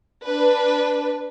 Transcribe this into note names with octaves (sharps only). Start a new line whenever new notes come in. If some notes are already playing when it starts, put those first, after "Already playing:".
D4 B4